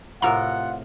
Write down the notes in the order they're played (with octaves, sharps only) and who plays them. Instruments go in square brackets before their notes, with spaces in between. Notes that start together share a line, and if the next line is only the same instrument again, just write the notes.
[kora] A2 C3 A#4 [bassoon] F4 [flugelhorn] F#5 [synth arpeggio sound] A#5 E6